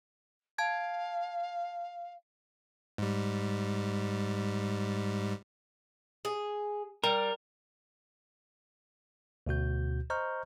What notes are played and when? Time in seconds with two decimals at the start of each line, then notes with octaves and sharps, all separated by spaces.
0.58 F5 A5 G#6
2.98 G#2 G3
6.25 G#4
7.04 G3 A#4
9.47 D2 B2 F#4 G6
10.10 C5 D#5 A#5 C#6 F6 G6